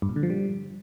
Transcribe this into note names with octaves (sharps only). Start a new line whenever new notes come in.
G2
A#2
D3
F3
G3